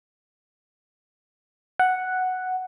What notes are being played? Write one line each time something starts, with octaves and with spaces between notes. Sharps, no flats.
F#5